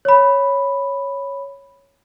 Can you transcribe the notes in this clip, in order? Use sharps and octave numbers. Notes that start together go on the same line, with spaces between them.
C#5 B5